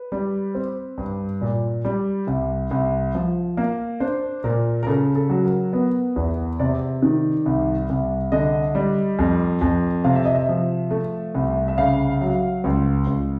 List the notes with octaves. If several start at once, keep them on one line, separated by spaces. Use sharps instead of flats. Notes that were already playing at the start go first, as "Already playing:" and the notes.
Already playing: B4
G3
C4
G2
A#2
G3
C2
C2
F3
A#3
D4 C5
A#2 A#4
A#4
C#3 A4
A4
F#3
A#4
B3
E2
C3 D5
D#3
C2
C2
D3 D#5
G3
F2
F2
C3 F5
E5
D#5
E5
F3
A3
C2
E5
C#3 F5
F#3
C#2
C#2